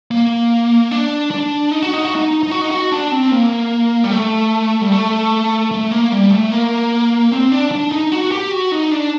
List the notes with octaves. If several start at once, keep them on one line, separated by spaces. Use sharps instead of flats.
A#3
D4
D4
D#4
F#4
D#4
F#4
D#4
D#4
F#4
D#4
F#4
D4
C4
A#3
G3
A3
G3
A3
A3
A#3
G3
A3
A#3
C4
D4
D4
D#4
F#4
G4
F#4
D#4
D4